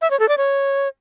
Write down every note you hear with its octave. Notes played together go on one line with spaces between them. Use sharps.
E5
C#5
A4
D5
C#5